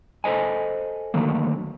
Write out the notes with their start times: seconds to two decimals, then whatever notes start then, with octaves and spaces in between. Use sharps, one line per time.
0.24 A4 C5 D#5 G#5
1.14 D3 D#3 F#3 A3 A#3